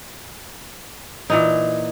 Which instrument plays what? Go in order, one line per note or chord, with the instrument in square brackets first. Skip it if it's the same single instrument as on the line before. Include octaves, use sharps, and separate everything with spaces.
[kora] A#2 E3 D#4